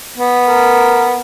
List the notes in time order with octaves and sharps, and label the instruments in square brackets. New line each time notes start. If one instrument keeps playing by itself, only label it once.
[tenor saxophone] B3
[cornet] A#4